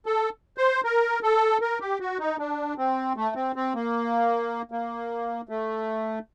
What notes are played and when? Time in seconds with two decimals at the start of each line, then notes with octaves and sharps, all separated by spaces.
0.06 A4
0.58 C5
0.84 A#4
1.23 A4
1.61 A#4
1.81 G4
2.00 F#4
2.19 D#4
2.39 D4
2.78 C4
3.16 A3
3.36 C4
3.56 C4
3.75 A#3
4.72 A#3
5.49 A3